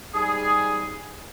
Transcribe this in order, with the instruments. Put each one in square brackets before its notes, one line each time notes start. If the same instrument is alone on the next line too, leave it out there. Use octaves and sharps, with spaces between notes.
[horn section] G#2 G3 G#4